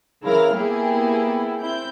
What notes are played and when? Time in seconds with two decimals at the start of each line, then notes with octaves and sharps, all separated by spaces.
0.22 C#3 E3 E4 A#4 F5 F6
0.54 A#3 B3 E4 G4 G#4
1.60 C4 E4 G6